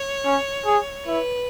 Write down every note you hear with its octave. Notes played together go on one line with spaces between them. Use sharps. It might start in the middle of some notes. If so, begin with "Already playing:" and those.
Already playing: C#5
C#4
G#4
E4 B4